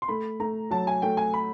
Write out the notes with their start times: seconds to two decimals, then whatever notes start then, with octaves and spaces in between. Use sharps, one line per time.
0.02 C6
0.08 A3 B5
0.40 A3 A#5
0.71 F#3 A5
0.87 G#5
1.02 A3 G5
1.17 G#5
1.34 B5